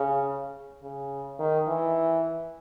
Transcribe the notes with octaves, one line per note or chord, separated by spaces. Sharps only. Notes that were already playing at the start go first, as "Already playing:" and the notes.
Already playing: C#3
C#3
D#3
E3